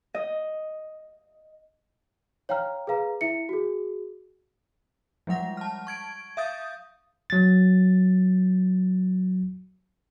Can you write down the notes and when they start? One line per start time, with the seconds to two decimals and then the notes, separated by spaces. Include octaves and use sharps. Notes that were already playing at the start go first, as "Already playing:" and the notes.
0.14 D#5
2.49 C#5 F5 G5 A#5 F6
2.87 G#4 B4 F5 A#5
3.21 E4 E5 C#7
3.49 F#4 G#4
5.27 F3 G3 G#3 F#5 A#6
5.57 A5 F6
5.87 C#6 G#6 D7
6.37 E5 F5 D#6 G6 A6
7.30 F#3 A6